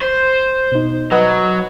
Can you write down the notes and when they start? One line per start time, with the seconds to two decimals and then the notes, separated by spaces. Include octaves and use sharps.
0.01 C5
0.72 B2 D#4
1.12 F#3 B4 D#5 F#5